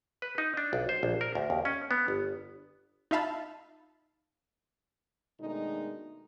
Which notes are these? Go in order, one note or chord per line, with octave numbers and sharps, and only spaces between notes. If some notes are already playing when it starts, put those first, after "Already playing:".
B4
D#4
D4
B1
C5
A#1
A#4
D2
D#2
C#4
B3
G1
D#4 F4 E5 F5 A5 B5
B2 D#3 G#3 A3 D4 D#4